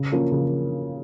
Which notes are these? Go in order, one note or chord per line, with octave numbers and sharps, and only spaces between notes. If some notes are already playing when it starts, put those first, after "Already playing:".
Already playing: C#3
F3 A#3 C#4
C#3